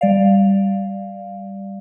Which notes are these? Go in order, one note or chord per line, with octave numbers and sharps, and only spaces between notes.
G3 D5 F5